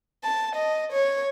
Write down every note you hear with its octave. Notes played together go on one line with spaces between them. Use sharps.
A5
D#5
C#5